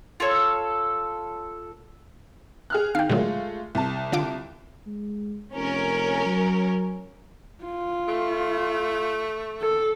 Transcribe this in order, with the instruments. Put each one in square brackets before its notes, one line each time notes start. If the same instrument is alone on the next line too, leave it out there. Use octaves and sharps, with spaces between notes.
[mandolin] F4 A4 C#5
[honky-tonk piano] G#4 F6 F#6
[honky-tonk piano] D#3 [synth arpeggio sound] F5 G5
[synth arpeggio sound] A#2 D3 F#3 [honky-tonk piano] G#3 A3 F4
[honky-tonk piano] C2 A5
[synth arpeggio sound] D3 F4 D6
[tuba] G#3
[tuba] F1 [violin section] C#4 A#4
[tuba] F#3
[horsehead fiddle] F4
[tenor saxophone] A3
[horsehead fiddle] A4